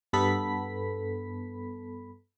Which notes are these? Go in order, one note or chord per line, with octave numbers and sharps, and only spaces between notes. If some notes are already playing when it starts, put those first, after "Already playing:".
G2 B3 A4 B5 B6